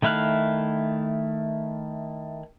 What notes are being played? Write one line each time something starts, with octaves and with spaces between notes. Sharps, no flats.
D#3 A3 E4 F5 F#6